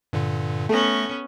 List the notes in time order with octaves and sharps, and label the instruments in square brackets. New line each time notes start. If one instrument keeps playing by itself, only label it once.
[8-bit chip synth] G2 A#2 D3
[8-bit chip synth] A3 A#6 [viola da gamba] B3 C#4 [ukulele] A4